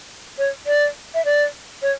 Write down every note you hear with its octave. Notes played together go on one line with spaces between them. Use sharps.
C#5
D5
E5
D5
C#5